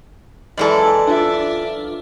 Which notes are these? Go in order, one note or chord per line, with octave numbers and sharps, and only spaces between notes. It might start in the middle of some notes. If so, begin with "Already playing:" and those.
F#2 E3 G#3 A4 D5
D4 F4 D5 E5